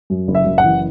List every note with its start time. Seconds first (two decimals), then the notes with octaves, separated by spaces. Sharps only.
0.10 F#2
0.28 F#1
0.35 E5
0.46 F#1
0.58 F#5
0.64 E3